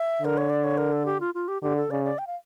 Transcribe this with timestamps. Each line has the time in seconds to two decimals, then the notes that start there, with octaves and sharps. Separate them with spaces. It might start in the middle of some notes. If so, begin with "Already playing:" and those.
Already playing: E5
0.22 D3 A#4
0.37 C#5
0.50 D5
0.64 C#5
0.78 A#4
0.92 A4
1.06 G4
1.20 F4
1.35 F4
1.48 G4
1.62 D3 G4
1.76 A4
1.90 C#3 D5
2.04 D5
2.18 G5
2.27 F5